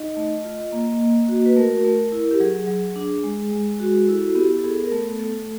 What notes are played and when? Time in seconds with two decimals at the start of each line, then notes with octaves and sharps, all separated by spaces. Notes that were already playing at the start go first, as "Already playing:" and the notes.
Already playing: D#4 D#5
0.17 A3
0.45 F4
0.72 A#3
1.01 A#3
1.28 F#4
1.46 B4
1.56 A3 A#4
1.84 A3
2.12 E4
2.31 G4
2.40 F#3 G#4
2.68 F#3
2.96 D4
3.24 G#3
3.52 G#3
3.80 F#4
4.08 E4 A4
4.36 B3 G4
4.59 A4
4.64 B3 G#4
4.83 A#4
4.92 A3 A4
5.19 A3 A4